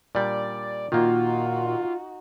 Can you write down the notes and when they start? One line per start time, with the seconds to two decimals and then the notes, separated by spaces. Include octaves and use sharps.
0.15 A#2 G3 D4 D5
0.92 A#2 D#3 A#3 D#4 F4 F#4